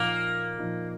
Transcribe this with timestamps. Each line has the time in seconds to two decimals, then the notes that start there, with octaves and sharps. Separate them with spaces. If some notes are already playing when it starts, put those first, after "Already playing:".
Already playing: A#2 F3 A#3 D#4
0.58 A#2 F3 D#4